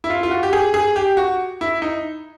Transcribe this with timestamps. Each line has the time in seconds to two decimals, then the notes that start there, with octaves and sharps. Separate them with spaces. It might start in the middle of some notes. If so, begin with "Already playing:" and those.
0.04 E4
0.10 F4
0.23 F4
0.31 F#4
0.43 G4
0.53 G#4
0.74 G#4
0.96 G4
1.17 F#4
1.61 E4
1.82 D#4